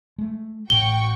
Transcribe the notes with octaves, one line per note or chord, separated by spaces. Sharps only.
G#3 A3
A1 A2 F#4 G5 C#6 G7